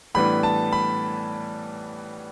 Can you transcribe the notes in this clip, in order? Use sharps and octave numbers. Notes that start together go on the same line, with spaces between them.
A2 E3 G3 B3 D4 B5
A5
B5